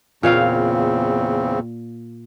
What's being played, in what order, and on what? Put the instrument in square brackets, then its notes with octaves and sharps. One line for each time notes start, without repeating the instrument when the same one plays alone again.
[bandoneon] E2 C#3 C4 [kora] A#2 C#5 F5